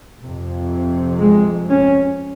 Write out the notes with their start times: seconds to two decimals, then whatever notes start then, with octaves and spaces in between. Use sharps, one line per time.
0.21 F2 C3
1.20 G#3
1.70 C#4